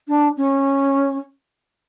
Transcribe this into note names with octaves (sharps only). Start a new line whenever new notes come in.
D4
C#4